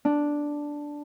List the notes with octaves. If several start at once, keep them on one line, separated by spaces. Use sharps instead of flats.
D4